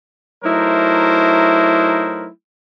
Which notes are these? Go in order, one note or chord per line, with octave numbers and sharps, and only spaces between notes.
F#3 A3 D#4 E4 A#4 C5